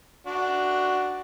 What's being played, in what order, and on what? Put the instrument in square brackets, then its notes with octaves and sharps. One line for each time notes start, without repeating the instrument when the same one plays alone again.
[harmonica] D4 F#4